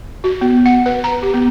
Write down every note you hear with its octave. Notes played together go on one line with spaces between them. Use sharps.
F#4
B3
F#5
B4
A#5
G4
B3